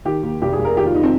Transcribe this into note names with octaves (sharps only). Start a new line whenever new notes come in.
D#3 G4
D#2
F1 G4
G#4
F1
A#4
D#3 G4
F4
D#3 D#4
C4